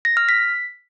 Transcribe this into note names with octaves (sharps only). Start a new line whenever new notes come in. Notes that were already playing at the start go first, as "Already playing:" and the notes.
A#6
F6
B6